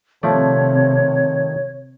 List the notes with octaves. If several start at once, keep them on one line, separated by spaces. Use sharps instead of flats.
C3 D#3 F3 A3 C#5 D5